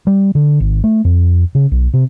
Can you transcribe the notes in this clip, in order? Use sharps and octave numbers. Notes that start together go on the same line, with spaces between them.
G3
D3
G#1
A3
F2
C#3
B1
C3